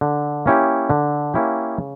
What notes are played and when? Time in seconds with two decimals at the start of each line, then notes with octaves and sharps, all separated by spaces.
0.01 D3
0.46 A#3 C#4 E4 G4
0.90 D3
1.34 A#3 C#4 E4 G4
1.78 C#3